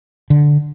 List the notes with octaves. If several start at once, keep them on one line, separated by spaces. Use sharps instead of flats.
D3